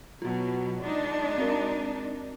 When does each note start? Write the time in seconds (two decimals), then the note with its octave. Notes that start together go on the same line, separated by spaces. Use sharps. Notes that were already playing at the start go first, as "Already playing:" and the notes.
0.22 B2 F#3 F4 F#4
0.83 G#3 D4 D#4
1.38 C4 F#4 A#4